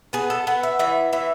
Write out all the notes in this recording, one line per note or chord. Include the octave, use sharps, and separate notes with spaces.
B3 G#4
A4
B3 B4
E5
E3 E5
E3 E5